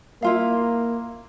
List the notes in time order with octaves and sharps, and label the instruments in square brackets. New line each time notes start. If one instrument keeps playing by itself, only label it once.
[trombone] A#3 [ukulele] E4 F4 F5